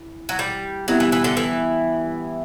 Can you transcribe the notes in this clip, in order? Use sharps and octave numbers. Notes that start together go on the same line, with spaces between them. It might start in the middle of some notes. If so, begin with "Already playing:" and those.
Already playing: E3
F#3
G3
F#3 G3 B3 E4 G4
E3
E3
D3
E3